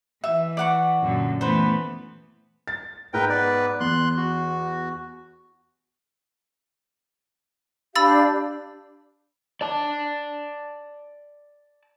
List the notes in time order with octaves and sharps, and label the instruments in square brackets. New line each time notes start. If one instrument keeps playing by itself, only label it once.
[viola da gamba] E3 [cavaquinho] E5
[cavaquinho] D5 F#5 C#6
[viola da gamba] F#2 A#2 D3
[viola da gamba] E3 A3 B3 [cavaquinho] B4 C5
[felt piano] A6
[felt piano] G#2 [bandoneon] A#4 B4 G5
[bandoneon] B3 B4 D5
[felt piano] E2 [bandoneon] C6 F#6
[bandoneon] F#4
[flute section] D4 G4 F5 [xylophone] B5 E6 A6
[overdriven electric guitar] D5 A5